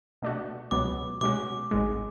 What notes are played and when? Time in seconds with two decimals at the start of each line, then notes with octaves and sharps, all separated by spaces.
0.22 B2 A3 D4 F#4
0.71 C#2 B2 F#3 B3 D6
1.21 B2 G#3 C#4 F#4 D6
1.71 G#1 G#2 G#3